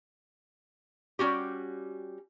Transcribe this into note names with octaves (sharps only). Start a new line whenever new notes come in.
G3 C#4 F#4 G4